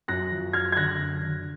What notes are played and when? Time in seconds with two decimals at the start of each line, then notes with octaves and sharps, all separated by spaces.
0.08 F#2 F#6 A#6
0.31 F3
0.53 F#2 F6 G#6
0.72 G#6
0.76 D3 F#6 A#6
0.99 F#2
1.23 D3